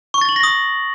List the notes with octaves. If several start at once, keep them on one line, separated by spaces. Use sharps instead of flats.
C#6
A6
F#7
A#6
D#6